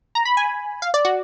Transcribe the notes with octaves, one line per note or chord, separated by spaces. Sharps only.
A#5
B5
G#5
F5
D5
F#4